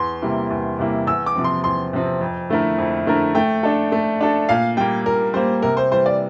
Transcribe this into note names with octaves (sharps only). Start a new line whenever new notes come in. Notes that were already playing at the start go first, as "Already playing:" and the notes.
Already playing: E2 C6
C3 G3 A#3 E4
E2
C3 G3 A#3 E4
E2 E6
D6
C3 F3 C4
C6
E2 C6
C3 F3 C4
F2
D3 A3 E4 A#4
F2
D3 A3 E4 A#4
A3 G5
D4 A4
A3
D4 A4
A#2 F5
G3 A#3 G5
A#2 A#4
G3 A#3 C5
C3 A#4
C5
E3 G3 C5
D5